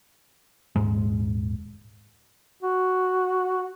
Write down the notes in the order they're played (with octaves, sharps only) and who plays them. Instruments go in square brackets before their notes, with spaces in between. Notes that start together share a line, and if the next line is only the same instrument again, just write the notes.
[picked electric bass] D#1 G#2 G#3
[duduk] F#4